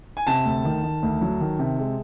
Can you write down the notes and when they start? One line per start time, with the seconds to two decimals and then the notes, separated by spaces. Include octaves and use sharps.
0.17 G#5
0.27 C3 A5
0.45 D2
0.65 D#3
0.83 D#3
1.02 D2
1.21 F#3
1.40 D#3
1.59 C3
1.79 G#3